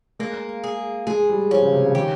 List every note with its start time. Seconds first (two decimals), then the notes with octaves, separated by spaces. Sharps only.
0.19 G#3 A#3
0.64 G#4
1.07 G#3 G#4
1.29 G3
1.51 F3 C#4
1.62 C#3
1.73 C3
1.86 C#3
1.95 D#3 G4